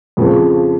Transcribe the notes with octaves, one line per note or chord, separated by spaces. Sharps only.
F2 C#3 F3